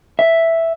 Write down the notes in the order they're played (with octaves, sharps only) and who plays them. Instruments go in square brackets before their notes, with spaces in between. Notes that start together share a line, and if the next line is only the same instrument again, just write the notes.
[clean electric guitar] E5